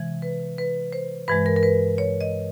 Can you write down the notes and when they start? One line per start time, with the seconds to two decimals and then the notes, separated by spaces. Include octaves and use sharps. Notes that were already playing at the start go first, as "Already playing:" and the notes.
Already playing: C3 E3 G#3
0.22 B4
0.58 B4
0.92 C5
1.28 G2 E3 G#3 B4
1.46 A#4
1.56 A#4
1.63 B4
1.98 C#5
2.21 D#5